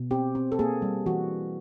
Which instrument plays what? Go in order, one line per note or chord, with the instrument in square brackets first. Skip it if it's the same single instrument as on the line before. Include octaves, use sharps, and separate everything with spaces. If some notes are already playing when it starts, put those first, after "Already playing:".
Already playing: [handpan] B2
C4 G4
C4
A4
A#3 G#4
G3
E3 F#4